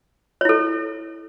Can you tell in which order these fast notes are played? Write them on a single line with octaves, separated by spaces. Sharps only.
C#5 E4 A4